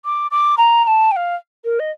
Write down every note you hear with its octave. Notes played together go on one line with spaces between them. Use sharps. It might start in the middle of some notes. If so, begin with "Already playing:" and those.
D6
D6
A#5
A#5
A5
G5
F5
A#4
D#5